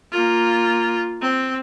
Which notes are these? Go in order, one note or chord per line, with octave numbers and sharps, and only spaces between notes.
A#3 F4
C4